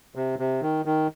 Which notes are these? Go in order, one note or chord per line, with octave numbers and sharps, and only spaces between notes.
C3
C3
D#3
D#3